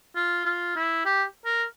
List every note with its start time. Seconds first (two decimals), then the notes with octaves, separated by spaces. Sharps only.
0.16 F4
0.45 F4
0.76 E4
1.06 G4
1.45 A#4